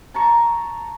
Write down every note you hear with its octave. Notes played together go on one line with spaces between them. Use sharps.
A5 A#5 C#6